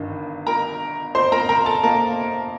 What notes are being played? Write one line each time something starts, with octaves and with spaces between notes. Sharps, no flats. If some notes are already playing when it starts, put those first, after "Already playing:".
Already playing: G1 G2 D#3
A#4 A#5
C5 C6
A#4 A#5
A#4 A#5
A4 A5
A#3 A#4